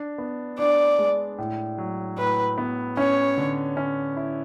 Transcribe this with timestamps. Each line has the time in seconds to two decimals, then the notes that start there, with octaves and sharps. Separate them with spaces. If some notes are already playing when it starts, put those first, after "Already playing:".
Already playing: D4
0.18 B3
0.59 D4 D5
0.99 G#3
1.38 A2
1.78 F#3
2.18 A2 B4
2.58 B3
2.97 C#4 C#5
3.37 D3
3.77 C#4
4.16 E4